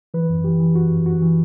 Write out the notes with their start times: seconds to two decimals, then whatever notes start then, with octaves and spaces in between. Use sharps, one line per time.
0.14 E3 B4
0.29 F#2
0.44 E3 G4
0.60 E3
0.75 F#2 F#4
0.91 F#2
1.06 F#2 F#4
1.22 E3